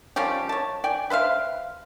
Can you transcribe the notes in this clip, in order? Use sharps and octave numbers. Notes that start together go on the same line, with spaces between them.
F3 G3 C#4 G4
C#5 A5
D5 G5 G#5
B4 C5 E5 F5